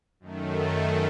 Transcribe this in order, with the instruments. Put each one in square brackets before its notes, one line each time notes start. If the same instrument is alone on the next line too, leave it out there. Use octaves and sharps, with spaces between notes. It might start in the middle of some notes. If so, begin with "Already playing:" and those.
[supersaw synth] F#2 D#3 A3